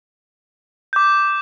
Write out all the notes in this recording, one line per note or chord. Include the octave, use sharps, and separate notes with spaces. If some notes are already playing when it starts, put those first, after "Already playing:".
D6 G6